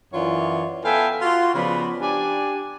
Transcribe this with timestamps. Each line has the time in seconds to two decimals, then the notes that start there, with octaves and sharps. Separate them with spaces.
0.13 F#2 E3 F4 C#5 D5
0.84 B3 A4 E5 F5 G5 G#5
1.21 F4 F#4
1.54 C#3 F3 B3 F#4 D5 B5
2.01 D4 G4 D5 G#5